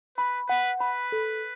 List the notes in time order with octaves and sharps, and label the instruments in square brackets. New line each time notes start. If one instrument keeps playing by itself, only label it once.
[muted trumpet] B4 [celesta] B5
[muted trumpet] B4 [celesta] F#5
[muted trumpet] B4 [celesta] B5
[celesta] A4